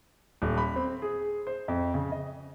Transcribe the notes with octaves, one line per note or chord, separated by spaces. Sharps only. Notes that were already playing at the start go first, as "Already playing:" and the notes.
D#1
B5
C4
G#4
C5
F2
C#3
D#5